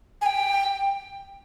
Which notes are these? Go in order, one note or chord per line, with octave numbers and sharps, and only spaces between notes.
G#5
G5